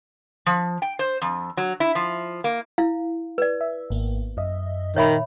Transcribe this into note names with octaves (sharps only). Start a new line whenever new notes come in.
F3
G5
C5
F2
F#3
E4
F3
A#3
E4 F5
B4 D5
E5
G#1 A#3 B3
F#2 D#5 E5
A#2 D#3 C#5 E5 B5